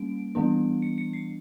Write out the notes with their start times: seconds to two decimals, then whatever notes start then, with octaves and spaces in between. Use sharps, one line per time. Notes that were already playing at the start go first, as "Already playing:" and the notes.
Already playing: G3 A#3 C#4 D7
0.35 E3 G3 B3 D4
0.82 C#7
0.98 C#7
1.13 C7